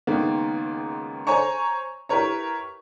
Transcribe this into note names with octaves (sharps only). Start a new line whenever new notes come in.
C#2 D#3 A#3 B3
C5 C#5 G#5 A#5 C#6
E4 G4 A#4 B4 C#5 A#5